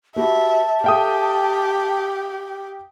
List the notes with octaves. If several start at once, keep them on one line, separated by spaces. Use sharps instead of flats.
F#4 G4 B4 E5 A5
G4 A4 E5 F5 G5 D#6